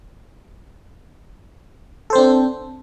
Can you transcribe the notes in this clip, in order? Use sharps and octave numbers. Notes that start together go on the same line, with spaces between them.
C4 D4 A4 C5